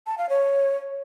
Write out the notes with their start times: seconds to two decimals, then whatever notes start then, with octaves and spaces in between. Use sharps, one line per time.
0.07 A5
0.18 F5
0.29 C#5